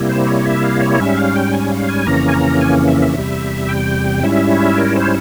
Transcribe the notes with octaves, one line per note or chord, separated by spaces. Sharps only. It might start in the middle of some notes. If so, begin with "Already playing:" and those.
Already playing: C3 G3 A#3 E4
C5
C#5
E5
F5
C#5
G#2 G3 C#4 E5
F5
G5
G#5
F5
G#5
F2 C#3 E3 A#3 C#4 A#5
G#5
A#5
G#5
E5
E5
E2 C3 G3
G5
G#2 G3 C#4 E4 E5
A#4
C5